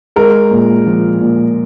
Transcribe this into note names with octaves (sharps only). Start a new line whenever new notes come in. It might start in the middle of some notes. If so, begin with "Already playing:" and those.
G#3 A#4
A#2
F3
A#2